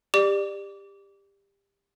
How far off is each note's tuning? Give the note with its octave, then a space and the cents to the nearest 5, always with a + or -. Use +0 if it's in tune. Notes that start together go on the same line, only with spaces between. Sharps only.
G4 +20 D5 +20 D6 -25